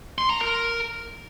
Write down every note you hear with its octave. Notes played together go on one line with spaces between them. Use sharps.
C6
A#5
A#4